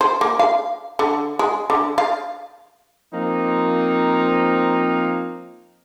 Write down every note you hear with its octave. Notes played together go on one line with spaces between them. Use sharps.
C5
A#3
F5
D3
G#3
D3
F5
F3 A#3 C4 D#4